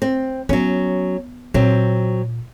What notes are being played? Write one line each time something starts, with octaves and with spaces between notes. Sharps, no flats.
C4
F#3 B3 C#4
A#2 F#3 C4